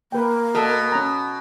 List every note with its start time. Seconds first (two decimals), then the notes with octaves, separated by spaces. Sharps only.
0.12 A#3 B4 G5
0.55 B2 A4 E6
0.92 C#4 A#5